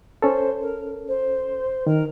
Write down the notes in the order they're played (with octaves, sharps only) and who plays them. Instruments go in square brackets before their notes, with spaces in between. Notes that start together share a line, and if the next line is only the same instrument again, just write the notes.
[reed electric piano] C#4 A4 [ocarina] C5
[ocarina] A#4
C5
[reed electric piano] D#3 [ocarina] A#4